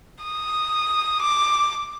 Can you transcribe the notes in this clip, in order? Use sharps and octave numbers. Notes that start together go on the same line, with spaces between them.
D#6
D6